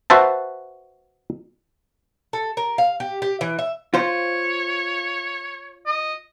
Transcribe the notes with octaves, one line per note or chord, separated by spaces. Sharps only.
F#4 B4 C5 E5 A5
A4
A#4
F5
G4
G4
E3
E5
F4 C5 C#5
D#5